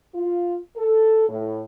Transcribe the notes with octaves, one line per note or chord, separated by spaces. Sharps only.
F4
A4
A2